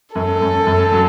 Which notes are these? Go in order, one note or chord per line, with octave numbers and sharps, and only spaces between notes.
F#2 A4
F#2
F#2
F#3